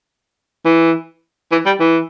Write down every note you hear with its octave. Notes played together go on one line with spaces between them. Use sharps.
E3
E3
G3
E3